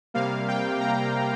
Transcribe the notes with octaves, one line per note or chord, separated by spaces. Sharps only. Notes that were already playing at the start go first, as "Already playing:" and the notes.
C3 G3 A#3 F5
G5
A#5